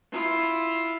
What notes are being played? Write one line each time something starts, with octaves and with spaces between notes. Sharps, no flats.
E4 F4